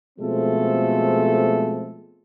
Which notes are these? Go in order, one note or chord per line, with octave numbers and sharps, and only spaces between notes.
B2 F3 G#3 A3 C4 A4